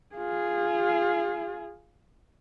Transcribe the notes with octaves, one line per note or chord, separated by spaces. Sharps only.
F4 G#4